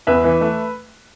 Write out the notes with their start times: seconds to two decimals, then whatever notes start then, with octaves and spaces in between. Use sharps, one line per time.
0.07 E2 B4 E5
0.24 E3
0.41 A3